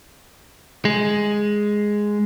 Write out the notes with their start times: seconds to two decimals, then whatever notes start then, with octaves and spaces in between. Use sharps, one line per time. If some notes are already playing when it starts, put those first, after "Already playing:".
0.85 G#3